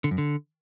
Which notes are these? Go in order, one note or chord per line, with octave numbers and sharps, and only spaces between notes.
D3
F#2
D3